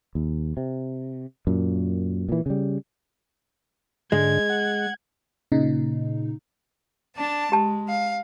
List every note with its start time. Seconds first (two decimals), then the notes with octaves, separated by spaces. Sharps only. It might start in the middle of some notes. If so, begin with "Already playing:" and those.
0.15 D#2
0.57 C3
1.47 F#2 A#2
2.29 A#2 E3
2.46 C#3 G3
4.12 G#2 D3 G#3 G#6
4.50 F#5
5.52 A#2 C#3 D#4
7.15 D4 A5
7.52 G#3 G4 A5
7.89 F5